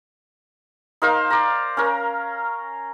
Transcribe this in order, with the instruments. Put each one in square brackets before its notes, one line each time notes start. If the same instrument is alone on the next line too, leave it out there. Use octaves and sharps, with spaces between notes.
[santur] D#4 A#4 C5 F5
D5 A#5
C#4 A#4